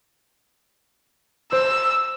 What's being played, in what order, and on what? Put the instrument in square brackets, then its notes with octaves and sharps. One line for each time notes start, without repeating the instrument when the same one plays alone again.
[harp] C5 [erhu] E6